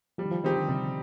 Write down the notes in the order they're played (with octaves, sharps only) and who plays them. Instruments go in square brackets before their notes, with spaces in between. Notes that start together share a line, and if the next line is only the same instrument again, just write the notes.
[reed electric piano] F3 [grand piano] G3
[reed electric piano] D#3
F3
[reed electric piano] D#3 [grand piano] C4 D#4 G4
[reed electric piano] D3
[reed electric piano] C3 [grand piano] G3